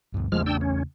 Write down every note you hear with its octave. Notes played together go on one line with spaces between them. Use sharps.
D2 G2
E2 C#3 F3 G#3 A3 F6
D4 G5 E6
C#4